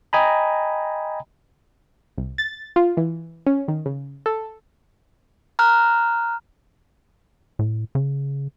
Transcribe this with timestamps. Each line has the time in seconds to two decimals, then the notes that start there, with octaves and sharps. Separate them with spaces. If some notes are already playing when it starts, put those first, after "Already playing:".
0.13 D#5 G5 G#5 A#5 B5
2.18 C2
2.38 A6
2.76 F4
2.97 E3
3.47 C#4
3.68 D#3
3.86 C#3
4.26 A4
5.59 A#5 F6 F#6
7.59 A2
7.95 C#3